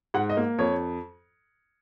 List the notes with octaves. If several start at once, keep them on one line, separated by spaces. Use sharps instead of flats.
G#2 F#5
D#5
A#3
F2 C#5